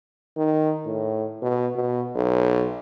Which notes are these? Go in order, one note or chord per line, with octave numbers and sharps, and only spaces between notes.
D#3
A2
B2
B2
B1